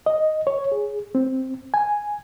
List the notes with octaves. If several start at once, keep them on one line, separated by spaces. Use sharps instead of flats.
D#5
C#5
G#4
C4
G#5